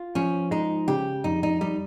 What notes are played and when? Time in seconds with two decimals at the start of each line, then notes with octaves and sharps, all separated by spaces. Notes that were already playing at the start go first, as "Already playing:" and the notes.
Already playing: F4
0.15 F3 C#4
0.51 G#3 D#4
0.88 C#3 G4
1.24 F2 D#4
1.43 D#4
1.61 G3 D#4